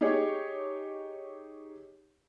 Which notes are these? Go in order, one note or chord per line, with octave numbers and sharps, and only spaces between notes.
D#4 G4 G#4 C#5